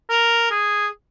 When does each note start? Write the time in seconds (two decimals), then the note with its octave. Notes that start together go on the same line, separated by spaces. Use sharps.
0.10 A#4
0.51 G#4